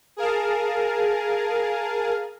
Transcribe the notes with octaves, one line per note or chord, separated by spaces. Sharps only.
G#4 A#4 F5 A5